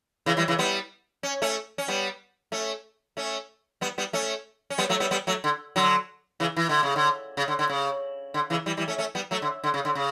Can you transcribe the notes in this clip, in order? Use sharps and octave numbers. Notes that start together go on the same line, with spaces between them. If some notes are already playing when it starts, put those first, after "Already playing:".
C#3 E3
E3 G3
C#3 E3
G3 B3
C#4
A3 C#4
C#4
G3 B3
A3 C#4
A3 C#4
G3 B3
G3 B3
A3 C#4
C#4
G3 B3
F#3 A3
G3 B3
G3 B3
F#3 A3
D3
D3 F#3
C#3 E3
E3
D3
C#3
D3
C#3
D3
D3
C#3
D3
C#3 E3
E3 G3
E3 G3
A3 C#4
A3 C#4
G3 B3
F#3 A3
D3
D3
C#3
D3
C#3